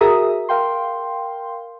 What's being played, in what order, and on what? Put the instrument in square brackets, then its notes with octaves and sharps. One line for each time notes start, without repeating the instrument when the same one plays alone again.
[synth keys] F#4 G#4 A#4 E5 A#5 D#6
A#4 F5 G5 C6